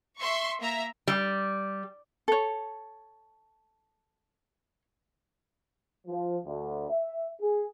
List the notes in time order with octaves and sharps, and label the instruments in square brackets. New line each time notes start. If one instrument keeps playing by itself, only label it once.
[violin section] E5 C6 C#6
A#3 E5 A#5
[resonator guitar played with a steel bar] G3
[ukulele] A4 C#5
[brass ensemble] F3
D2
E5
G#4